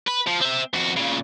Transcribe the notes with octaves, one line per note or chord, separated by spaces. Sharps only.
B4
F3
C4 E5
F2 F#4
A#2 C#3